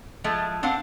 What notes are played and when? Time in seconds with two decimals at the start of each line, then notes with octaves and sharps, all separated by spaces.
0.24 F3 G#3 A3
0.63 C4 D4 C5 F5 F#5